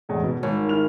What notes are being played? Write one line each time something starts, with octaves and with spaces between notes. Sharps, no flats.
E2 A2 G#3
B2
G#1 C#5
E4 F6 F7